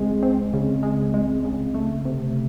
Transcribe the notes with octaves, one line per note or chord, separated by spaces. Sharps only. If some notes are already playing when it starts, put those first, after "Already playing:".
Already playing: C#2 G#3 C4
C4
C#3
G#3
G#3
C#3
A3
C3